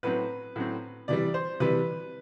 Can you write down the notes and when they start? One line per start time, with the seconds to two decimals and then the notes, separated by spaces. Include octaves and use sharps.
0.03 A2 F#3 C4 B4
0.56 A2 F#3 C4
1.08 C3 E3 G3 D5
1.34 C5
1.60 C3 E3 G3 B4